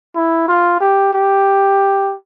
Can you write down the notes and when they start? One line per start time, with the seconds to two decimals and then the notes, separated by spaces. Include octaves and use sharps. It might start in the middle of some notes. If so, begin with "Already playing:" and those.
0.16 E4
0.48 F4
0.80 G4
1.13 G4